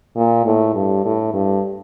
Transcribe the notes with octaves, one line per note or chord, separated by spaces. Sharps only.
A#2
A2
G2
A2
G2